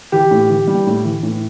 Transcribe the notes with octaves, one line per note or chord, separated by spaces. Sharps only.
E3 G4
A2
E3
G3
A2
E3
A2